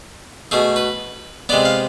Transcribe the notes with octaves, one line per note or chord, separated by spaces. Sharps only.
B2 A3 G#4
B4
C3 G#3 B3 D5
F5